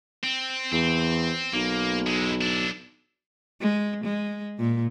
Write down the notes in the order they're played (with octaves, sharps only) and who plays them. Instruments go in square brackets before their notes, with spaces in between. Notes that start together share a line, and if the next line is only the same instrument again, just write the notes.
[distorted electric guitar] C4
[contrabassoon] E2 [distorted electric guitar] C4
[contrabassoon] B1 [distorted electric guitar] A#3
[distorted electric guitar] G#3 E4
D4 E4
[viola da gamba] G#3
G#3
A#2